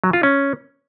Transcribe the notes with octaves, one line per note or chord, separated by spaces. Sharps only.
F#3
F4
C#4